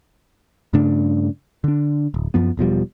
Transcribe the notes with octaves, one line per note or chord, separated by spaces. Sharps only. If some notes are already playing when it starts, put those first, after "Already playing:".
G2 C#3 A3 D4
D3 D4
D1
F#2 F3 B3
E1 B2 F3 G3